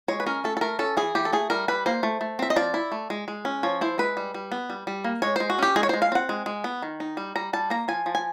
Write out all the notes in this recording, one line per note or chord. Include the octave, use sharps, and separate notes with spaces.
G#3 C#5
B4
C#4 A#4
A3 A4
A4
A3 A#4
C#4 A4
E3 G#4
E3 G4
A4
A3 G#4
G3 A#4
G3 B4
A#3 C5
A3
A3
C4 E5
D#5
F3 D5
E4
A3
G#3
G#3
C#4
F3 C#5
E4 C5
G#3 B4
G3
G3
B3
G3
G3
A#3
G#3 C#5
G#3 C5
F#4
C#4 G4
G#3 G#4
C#5
G#3 C5
F5
C4 F#5
G#3
G#3
B3
D#3
D#4
G3
G3 A#5
G3 A5
A#3 A#5
F3 G#5
F3
G#5